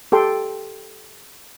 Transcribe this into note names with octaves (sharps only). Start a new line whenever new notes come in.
G4 A4 G5 C6